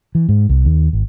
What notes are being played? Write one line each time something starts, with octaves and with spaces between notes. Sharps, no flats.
E3
G#2
C2
D#2
G#1